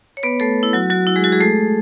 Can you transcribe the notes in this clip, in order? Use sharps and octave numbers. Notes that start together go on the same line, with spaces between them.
C#5
B3 B4
A3 A4
E4
F#3 F#4
F#3 F#4
E4
G#3 G#4
F#3 F#4
G#3 G#4
A3 A4